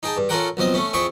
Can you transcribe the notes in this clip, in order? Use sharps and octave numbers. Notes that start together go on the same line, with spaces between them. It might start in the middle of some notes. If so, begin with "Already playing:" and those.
D#4 G#4 G5 A5
G2
C#4 F4 A4 A#4 F#5 G5
B1 F3 C4 D#5
A3 C#4
F2 E4 G#4 E5 G5 C#6